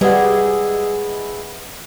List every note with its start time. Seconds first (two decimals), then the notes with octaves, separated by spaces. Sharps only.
0.01 G3 G#3 E4 G#4 B4 F#5